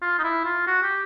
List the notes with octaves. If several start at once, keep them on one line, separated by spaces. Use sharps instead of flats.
F4
D#4
E4
F4
F#4
G4